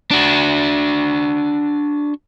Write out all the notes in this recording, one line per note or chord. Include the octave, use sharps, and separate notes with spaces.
D4 F#4